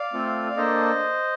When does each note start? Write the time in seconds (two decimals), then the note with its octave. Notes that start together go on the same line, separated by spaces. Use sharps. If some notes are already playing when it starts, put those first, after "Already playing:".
Already playing: D5 F5
0.13 A3 C4 F4 A4
0.51 D5
0.57 A#3 D4 A4 C5 D#5